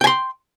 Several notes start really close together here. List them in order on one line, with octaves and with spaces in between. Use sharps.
G5 G#5 C6